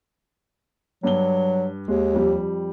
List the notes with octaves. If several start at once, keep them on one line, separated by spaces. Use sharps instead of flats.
G2 F#3 G7
D#2 G#3
F2 G3